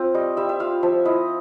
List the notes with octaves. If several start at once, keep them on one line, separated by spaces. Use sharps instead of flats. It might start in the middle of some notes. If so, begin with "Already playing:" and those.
Already playing: C4 F4
G3 D#5
G3 E5
E5
F4 F5
F3 E5
E4 D#5